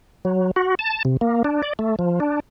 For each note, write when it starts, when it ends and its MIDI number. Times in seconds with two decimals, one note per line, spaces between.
0.25 0.51 54
0.56 0.75 66
0.79 1.03 81
1.05 1.17 48
1.21 1.43 58
1.44 1.62 62
1.63 1.73 74
1.79 1.96 57
1.99 2.20 53
2.20 2.40 62